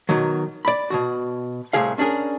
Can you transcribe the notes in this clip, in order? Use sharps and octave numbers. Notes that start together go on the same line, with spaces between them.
B2 D#3 F#3
D5 B5
B2 D#3 F#4
C2 F#2 A2 C3 G#4 F5
C#4 D4 G4 G#4 A#4